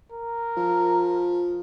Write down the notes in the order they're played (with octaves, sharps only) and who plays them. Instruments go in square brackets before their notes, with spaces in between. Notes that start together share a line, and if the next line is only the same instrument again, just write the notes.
[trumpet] A#4
[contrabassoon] F3